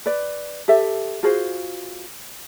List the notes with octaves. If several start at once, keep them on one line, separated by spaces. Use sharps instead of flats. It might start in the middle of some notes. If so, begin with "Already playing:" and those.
B4 D5
G4 A4 E5
F4 F#4 G#4 C5